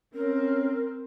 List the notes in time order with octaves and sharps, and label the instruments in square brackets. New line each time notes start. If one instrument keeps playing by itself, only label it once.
[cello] C4 [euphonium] C#4 [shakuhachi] A#4